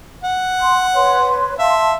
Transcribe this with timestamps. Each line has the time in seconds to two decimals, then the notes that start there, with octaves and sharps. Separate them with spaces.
0.24 F#5
0.60 C6
0.94 B4 C#5 C6
1.59 E5 F5 A5 C6